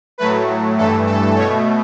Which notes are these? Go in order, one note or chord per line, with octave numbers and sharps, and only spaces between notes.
A2 F#3 A3 B4
G2 E3 A3 A4
A4
B2 A3 C#5